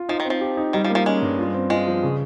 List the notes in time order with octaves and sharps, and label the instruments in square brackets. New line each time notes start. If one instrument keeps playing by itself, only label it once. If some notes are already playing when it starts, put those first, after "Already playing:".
Already playing: [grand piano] F4
[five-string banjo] F3 [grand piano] D#4
[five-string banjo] D#3
[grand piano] C4
[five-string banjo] F3
[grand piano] G4
D#4
[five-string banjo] D#3 [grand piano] G3
[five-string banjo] F3
[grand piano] A#3
[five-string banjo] F3
[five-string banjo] G#3 [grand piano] C#4
[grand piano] G2
F4
C4
[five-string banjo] G#3 [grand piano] F4
[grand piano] F3
C#3